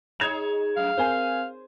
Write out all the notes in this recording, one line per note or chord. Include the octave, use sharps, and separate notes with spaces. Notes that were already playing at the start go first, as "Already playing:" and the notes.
D#4 G#4 C#5 G#6 E7 F7
F#2 A3 F5
C4 A#4 C5 G#5